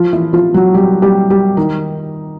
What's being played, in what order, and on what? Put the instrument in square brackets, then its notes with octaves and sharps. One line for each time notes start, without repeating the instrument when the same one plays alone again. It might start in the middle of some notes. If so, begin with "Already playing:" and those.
Already playing: [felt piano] F3 F4
E3 E4
F3 F4
F#3 F#4
G3 G4
G3 G4
G3 G4
D#3 D#4